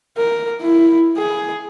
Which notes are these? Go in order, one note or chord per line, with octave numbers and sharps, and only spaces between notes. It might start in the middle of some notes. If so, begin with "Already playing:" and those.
A#4
E4
G#4